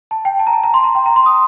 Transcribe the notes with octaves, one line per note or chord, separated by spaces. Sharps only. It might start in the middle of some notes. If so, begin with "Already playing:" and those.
A5
G5
A5
A#5
A5
A#5
C6
A#5
G5
A#5
C6
D#6